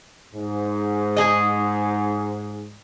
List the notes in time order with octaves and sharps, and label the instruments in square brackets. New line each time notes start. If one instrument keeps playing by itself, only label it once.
[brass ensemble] G#2
[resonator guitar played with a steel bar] G#4 D#5